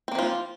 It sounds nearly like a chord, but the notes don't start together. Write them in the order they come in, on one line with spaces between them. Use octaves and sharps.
C4 A#3 F3 F4